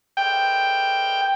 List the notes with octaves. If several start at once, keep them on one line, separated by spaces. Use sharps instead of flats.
G5